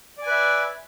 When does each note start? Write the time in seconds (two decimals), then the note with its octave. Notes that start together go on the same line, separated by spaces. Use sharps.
0.18 D5
0.22 G#5
0.27 B4
0.31 E5